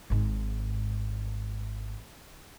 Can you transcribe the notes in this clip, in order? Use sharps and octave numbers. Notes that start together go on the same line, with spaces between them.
G#1 G#2